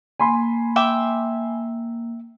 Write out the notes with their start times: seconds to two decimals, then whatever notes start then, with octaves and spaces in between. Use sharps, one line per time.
0.19 A#3 G#5 B5 C6
0.76 E5 G5 D6